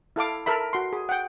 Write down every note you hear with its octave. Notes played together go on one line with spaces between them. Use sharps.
E4 A4 F5 D6
A4 A#4 E5 B5
F#4 C6
G#4
F#5 G5